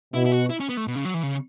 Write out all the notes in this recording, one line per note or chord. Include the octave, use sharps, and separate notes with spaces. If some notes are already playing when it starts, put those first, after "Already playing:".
B2 E4
E4
F#4
E4
C#4
B3
A3
B2
C#3
F#3
E3
C#3